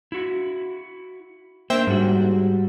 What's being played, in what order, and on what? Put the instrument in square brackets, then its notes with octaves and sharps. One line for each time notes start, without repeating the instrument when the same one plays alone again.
[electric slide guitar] E4 F#4
[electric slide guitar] A#3 D4 [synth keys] C5 E5 G5
[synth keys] G#2 [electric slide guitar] G3 F#4